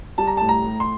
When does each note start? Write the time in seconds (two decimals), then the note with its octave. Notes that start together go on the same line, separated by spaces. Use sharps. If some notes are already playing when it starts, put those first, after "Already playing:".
0.18 G3 A5
0.27 A#5
0.37 A2 A5
0.49 A#5
0.64 A2
0.80 C6